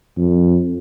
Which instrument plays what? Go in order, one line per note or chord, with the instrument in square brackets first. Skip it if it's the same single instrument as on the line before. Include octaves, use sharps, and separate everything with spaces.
[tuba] F2